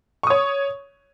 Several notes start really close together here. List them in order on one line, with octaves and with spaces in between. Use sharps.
C#6 D#6 C#5